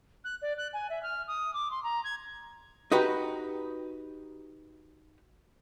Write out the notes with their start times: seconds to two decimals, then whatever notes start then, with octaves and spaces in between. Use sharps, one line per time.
0.24 F#6
0.42 D5
0.58 F#6
0.73 G#5
0.90 E5
1.03 F6
1.28 D#6
1.54 D6
1.71 C6
1.84 A#5
2.04 G#6
2.92 D#4 F#4 G4 B4